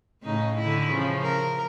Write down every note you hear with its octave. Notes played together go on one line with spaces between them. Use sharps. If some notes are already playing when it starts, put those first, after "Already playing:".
A2 C#3 D#4
D3 E4
C#3 F3
A#4